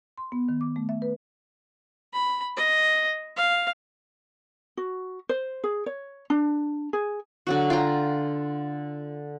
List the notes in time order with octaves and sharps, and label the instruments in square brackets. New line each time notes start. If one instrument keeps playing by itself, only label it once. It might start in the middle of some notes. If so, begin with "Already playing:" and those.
[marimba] C6
B3
D#3
D6
A3
E5
B4
[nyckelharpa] B5
D#5
F5
[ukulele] F#4
C5
G#4
C#5
D4
G#4
[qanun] D3 F#3 F#4
F4 G5 A#5